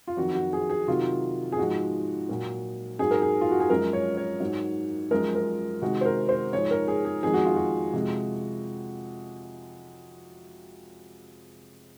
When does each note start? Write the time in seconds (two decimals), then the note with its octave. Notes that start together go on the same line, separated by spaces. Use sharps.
0.08 F4
0.17 F2 D#3 F#3 F#4
0.35 F#4
0.53 G#4
0.70 G#4
0.88 C3 D#3 F#3 F4
1.52 G#4
1.58 G#2 F3 G#3 F#4
2.29 A#2 F#3
2.99 G#2 F#3 G#4
3.11 A#4
3.22 G#4
3.41 F4
3.51 F#4
3.60 G#4
3.70 F#2 F3 G#3 A#4
3.93 C#5
4.17 C#5
4.40 G#2 F#3
5.11 F#2 F3 G#3 A#4
5.35 A#4
5.82 C3 D#3 G#3 F#4
6.01 C5
6.05 A#4
6.29 C5
6.53 G#2 F3 G#3 C#5
6.71 A#4
6.88 G#4
7.05 G#4
7.23 F2 D#3 G#3 G#4
7.34 F#4
7.45 F4
7.56 F#4
7.93 C3 F3 G#3